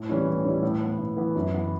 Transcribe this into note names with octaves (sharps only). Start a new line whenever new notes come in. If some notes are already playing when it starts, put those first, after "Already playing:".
Already playing: A2
E3 G3 C#4 E4
A2
E3 G3 C#4 E4
A2
E3 B3
A2
E3 B3
F#2
E3 B3